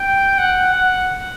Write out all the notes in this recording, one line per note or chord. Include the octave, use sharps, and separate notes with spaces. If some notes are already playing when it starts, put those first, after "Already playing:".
Already playing: G5
F#5
F#5